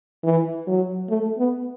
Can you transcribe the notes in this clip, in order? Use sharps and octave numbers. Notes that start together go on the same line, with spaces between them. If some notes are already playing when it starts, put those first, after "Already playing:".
E3
F#3
A3
B3